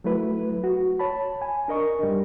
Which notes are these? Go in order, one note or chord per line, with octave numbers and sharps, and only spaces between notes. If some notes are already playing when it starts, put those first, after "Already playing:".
F#3 A3 E4 B4
F#4
C#5 A5 B5
G#5
D4 A#4 D#5 C#6
F#2 G3